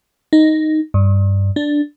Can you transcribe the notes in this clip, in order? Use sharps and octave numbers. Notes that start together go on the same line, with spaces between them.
D#4
G2
D4